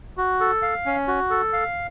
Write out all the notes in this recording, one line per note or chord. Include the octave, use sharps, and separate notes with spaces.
F#4
A4
F5
C#4
F#4
A4
F5